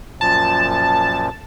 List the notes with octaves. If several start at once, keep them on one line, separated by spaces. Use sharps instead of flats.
F#2 A#2 F3 A5